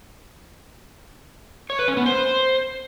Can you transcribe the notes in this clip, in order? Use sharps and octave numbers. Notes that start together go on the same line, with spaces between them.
C#5
B4
C#4
B3
C5